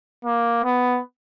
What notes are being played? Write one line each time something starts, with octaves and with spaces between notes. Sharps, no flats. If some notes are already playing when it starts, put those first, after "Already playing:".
A#3
B3